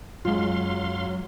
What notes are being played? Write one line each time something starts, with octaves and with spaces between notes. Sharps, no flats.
F#2 F#3 G#3 F4 F5 C6